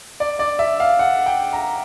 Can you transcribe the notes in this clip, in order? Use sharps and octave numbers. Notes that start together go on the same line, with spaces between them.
D5
D5
E5
F5
F#5
G5
A#5